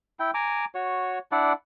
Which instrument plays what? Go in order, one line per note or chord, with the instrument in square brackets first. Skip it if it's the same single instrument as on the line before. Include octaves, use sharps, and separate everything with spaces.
[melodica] E4 G5
G#5 A#5 D6
F#4 C#5
D4 E4 D5 F#5